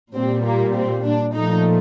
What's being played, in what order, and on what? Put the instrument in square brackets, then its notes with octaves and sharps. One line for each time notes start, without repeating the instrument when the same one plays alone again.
[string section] A#2 G3 C4
A#3
C4
D4
A#2 F3 A3 D#4